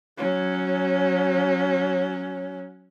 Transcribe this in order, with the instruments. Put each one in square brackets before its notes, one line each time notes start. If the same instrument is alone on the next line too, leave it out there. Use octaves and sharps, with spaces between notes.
[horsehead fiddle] F#3 C#4